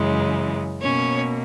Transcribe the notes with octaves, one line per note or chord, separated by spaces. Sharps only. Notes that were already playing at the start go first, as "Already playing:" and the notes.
Already playing: F#2 C#3 E3 G#3
B2 A#3 C#4 C#5